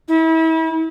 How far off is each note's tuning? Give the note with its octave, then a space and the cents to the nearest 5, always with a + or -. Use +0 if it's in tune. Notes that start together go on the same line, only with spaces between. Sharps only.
E4 -35